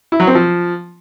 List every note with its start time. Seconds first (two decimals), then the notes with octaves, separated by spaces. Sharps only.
0.12 E4
0.20 F#3
0.27 C4
0.35 F3